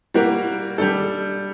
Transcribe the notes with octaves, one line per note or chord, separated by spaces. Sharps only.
G3 A#3 F#4 A#4
G3 D4 A4